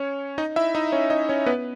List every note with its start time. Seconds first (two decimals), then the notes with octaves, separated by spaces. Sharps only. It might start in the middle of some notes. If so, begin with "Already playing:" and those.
Already playing: C#4 C#5
0.38 D#4 D#5
0.56 E4 E5
0.75 D#4 D#5
0.92 C#4 C#5
1.10 D#4 D#5
1.29 C#4 C#5
1.46 B3 B4